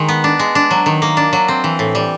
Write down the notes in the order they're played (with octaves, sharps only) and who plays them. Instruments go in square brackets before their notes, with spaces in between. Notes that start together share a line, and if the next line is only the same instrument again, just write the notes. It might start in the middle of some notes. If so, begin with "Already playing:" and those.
Already playing: [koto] D#3 G#3
B3
D4
G#3
D4
F#3
D#3
A#3
D4
F#3
C4
E3
A2
G3